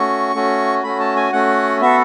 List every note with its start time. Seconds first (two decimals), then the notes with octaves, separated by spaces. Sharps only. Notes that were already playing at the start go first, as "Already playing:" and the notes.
Already playing: A3 C#4 F#4 C#6
0.35 A3 C#4 F#4
0.83 A3 C#4 F#4 B5
1.00 A5
1.16 G#5
1.32 A3 C#4 F#4 F#5
1.81 B3 F#4 A4 E5